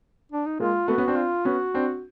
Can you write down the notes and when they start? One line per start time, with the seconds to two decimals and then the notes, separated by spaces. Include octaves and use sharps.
0.32 D4
0.46 D#4
0.60 G#3 A#3 F4
0.88 A3 B3 F#4
0.98 B3 C#4
1.08 C4 D4
1.17 F4
1.45 B3 C#4 F#4
1.74 C4 D4